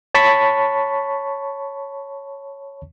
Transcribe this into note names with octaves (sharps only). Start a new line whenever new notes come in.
C#5 A5 B5 C#6 B6